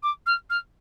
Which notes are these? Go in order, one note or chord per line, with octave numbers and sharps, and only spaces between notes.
D6
F6
F6